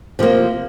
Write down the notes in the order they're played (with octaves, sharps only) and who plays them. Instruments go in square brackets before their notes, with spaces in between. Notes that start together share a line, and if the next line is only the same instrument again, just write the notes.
[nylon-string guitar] C3 F3 A#3